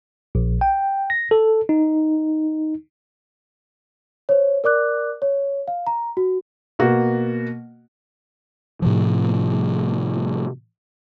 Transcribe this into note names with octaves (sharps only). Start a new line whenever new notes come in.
A#1
G5
A#6
A4
D#4
C5 C#5
A#4 D5 D6 F#6
C#5
F5
A#5
F#4
B2 A#3 F#4
A2 C3 F3